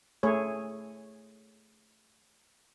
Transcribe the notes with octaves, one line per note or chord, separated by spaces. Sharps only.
A3 G#4 C#5